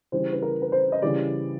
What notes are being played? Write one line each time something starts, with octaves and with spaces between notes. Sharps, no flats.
C#3 E3 G3 C5
B4
A#4
B4
C5
D#5
C#3 E3 G3 D5